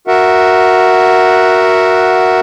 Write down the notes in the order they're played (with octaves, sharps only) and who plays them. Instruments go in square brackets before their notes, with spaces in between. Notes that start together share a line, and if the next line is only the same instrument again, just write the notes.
[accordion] F#4 A#4 E5 F#5